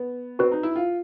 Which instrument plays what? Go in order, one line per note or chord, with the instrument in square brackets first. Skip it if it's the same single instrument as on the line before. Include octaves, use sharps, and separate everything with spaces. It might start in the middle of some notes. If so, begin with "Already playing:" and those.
Already playing: [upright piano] B3
[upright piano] C4 [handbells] F#4 B4 D5
[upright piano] D#4
E4
F4